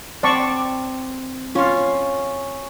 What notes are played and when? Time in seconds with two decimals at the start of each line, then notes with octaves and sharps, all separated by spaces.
0.23 C4 D5 A5 C#6
1.55 C#4 F4 C#5